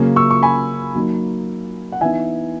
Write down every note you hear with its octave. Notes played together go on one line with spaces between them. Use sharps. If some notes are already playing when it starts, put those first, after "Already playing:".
Already playing: C#3 F#3 A#3 C#4
C#6 E6
C#6
G#5 B5
F#3 A#3 D#4
F#5
E3 B3 D#4 E5 G#5